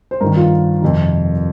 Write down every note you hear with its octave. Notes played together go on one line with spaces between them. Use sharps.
C5
G2 D#3 A#4
F4
F2 C3 D#3